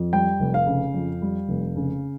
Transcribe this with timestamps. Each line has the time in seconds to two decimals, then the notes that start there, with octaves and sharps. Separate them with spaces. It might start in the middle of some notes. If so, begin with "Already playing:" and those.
Already playing: F2
0.13 G3 G5
0.40 F1
0.54 F5
0.67 C#3
0.94 F2
1.22 G3
1.48 F1
1.76 C#3